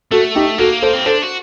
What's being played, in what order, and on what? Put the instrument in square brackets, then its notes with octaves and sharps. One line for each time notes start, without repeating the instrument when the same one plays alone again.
[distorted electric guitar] A3 [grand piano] F#4 A4
[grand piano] D#4 G4
[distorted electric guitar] A#3 [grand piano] F#4 A4
[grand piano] A4 C5
[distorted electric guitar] C4
[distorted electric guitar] D4 [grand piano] A4 C5
[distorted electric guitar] F#4